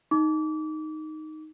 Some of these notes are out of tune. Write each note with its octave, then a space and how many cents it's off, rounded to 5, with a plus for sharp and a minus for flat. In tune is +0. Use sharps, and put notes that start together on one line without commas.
D#4 +0 D6 -30